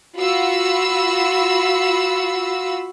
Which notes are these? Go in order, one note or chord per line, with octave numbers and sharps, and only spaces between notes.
F4 F#4 B5 E6